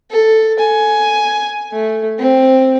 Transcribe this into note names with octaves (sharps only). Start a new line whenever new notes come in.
A4
G#5
A3
C4